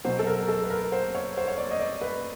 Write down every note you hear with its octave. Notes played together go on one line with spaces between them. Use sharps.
B2 F#3 C5
A4
A#4
A4
B4
A#4
C5
C#5
C5
C#5
D5
D#5
D5
B4